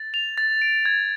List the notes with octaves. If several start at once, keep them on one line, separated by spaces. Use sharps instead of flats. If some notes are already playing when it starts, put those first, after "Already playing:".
Already playing: A6
F7
A6
D7
G#6